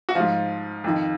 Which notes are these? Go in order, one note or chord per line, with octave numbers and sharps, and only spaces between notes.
F#4
G#2 F3 F4
F2 D#3